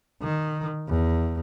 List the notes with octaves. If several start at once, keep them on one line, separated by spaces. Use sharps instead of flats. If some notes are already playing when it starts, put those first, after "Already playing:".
D#3
E2